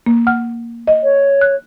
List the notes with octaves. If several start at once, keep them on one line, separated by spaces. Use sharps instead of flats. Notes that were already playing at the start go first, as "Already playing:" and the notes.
A#3
F#5 F6
D#5
C#5
F#6